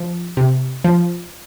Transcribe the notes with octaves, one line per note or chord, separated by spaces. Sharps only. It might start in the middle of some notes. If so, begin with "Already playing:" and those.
Already playing: F3
C3
F3